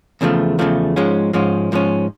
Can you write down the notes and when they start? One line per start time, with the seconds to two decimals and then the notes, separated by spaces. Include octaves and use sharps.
0.21 E2 C#3 F3 A3
0.59 E2 C#3 F3 A3
0.96 G#2 F3 G#3 C#4
1.33 G#2 F3 G#3 C#4
1.72 G#2 F3 G#3 C#4